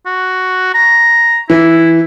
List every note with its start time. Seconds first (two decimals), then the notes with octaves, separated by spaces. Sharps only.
0.06 F#4
0.74 A#5
1.50 E3 E4